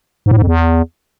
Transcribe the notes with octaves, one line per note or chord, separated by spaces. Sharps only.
G#2
A2
G#2
F2
E2